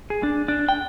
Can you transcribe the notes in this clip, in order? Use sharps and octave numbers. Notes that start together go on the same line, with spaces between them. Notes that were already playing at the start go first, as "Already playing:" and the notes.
G#4
D4
D4
G5